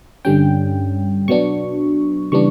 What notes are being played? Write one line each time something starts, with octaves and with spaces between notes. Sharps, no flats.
G2 D3 G3 C#4 G5
B2 F#3 B3 D4 C#6
C#3 E3 G3 B3 D4 C#6